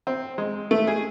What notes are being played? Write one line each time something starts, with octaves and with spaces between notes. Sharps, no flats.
C4
G#3
A3
G#4